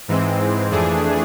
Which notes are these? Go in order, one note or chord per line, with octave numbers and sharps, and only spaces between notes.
G#2 E3 G#3 C4
F2 E3 A3 D4 G#4